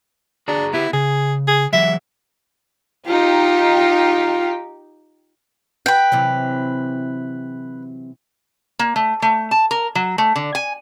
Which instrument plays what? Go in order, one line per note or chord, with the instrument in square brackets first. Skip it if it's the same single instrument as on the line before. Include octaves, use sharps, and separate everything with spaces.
[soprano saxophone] D4 [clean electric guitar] F#4 G#4 A#5
[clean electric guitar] B3 G4 [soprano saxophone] E4
[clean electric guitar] C#3 [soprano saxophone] G#4
[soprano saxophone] G#4
[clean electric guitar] E3 F#3 G#3 [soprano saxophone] E5
[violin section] D#4 G4 [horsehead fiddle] F4
[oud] F#4 [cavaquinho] B4 G5
[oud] C3 E3 F#3
[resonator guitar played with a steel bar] A#3
A3
A3
A5
A#4
F#3
A3
D3
G#5